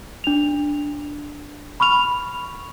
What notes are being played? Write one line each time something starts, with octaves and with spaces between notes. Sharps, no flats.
D4 F7
B5 C#6 F6 F7